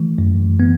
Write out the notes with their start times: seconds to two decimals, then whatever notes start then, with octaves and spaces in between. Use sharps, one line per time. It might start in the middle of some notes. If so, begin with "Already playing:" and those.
Already playing: E3 A3
0.18 F#2
0.60 B3